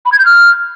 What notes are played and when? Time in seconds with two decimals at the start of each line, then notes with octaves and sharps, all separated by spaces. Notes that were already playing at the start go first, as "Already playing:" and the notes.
0.06 B5
0.12 G#6
0.19 G6
0.26 F6